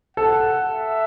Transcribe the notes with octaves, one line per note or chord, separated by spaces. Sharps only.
A4 F#5
E5